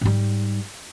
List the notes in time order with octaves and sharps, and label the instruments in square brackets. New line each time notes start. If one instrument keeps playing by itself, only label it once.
[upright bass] G#2 G3